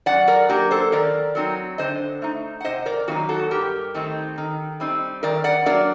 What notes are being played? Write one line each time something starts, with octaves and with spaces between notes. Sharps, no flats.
F#2 D5 F#5
A#4 D5
F#3 A#3 D4 G4 A#4
A4 C5
D#3 A#4 D5
F#3 C4 D#4
D3 C5 D#5
A3 D#4
F#5
C3 C5 D#5
A#4 D5
D#3 F#3 A#3 D#4 F#4
F#4 A4
G2 G4 A#4
D#3 A3 C4 D#4
D#3
G3 C4 D#4
D#3 A#4 D5
D5 F#5
F#3 A#3 D4 A#4 D5